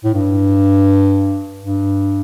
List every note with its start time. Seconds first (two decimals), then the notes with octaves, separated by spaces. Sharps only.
0.04 A2
0.14 G2
1.63 G2